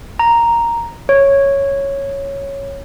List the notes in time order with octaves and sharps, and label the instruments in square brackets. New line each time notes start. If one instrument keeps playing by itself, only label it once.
[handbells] A#5
C#5